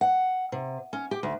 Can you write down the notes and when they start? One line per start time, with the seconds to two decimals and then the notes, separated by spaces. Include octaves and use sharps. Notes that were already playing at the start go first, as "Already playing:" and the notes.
0.01 F#5
0.52 C3
0.93 C#4
1.11 G4
1.23 D2